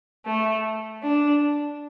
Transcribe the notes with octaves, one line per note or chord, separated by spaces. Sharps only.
A3
D4